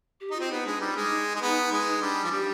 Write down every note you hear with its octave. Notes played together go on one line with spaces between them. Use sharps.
G4
D#4
C4 F4
B3 D#4
G#3 D4
G3 D#4
G#3
D#4
G#3
B3
G#3
G3 D4
F3
G3 G4